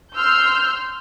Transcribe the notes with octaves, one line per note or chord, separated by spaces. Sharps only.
C6 E6 F6 G6